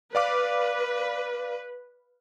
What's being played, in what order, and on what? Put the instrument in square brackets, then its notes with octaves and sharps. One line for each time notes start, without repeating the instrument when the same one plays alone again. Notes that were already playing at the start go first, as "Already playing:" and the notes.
[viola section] B4 [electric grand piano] D5 F5 D6